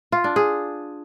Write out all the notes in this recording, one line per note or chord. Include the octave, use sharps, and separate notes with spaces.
F4
D4
G#4